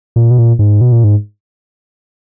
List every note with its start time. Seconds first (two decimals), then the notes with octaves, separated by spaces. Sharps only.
0.16 A#2
0.31 B2
0.38 A#2
0.59 G#2
0.81 B2
0.92 A#2
1.04 G#2